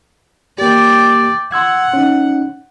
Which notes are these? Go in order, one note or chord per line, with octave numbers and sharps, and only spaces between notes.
A#3 G4 D5 G5
F#5 C6 E6 G#6
C#4 D#4